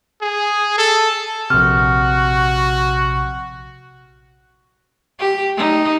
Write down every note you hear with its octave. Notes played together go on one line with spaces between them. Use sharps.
G#4
A4
A#1 C3 F#4 F6
G4
D#4